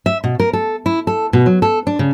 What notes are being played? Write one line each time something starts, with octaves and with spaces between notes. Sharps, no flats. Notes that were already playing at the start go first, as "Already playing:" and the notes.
E5
B2
A#4
A4
E4
A4
B2
F#3
A4
D4
C#3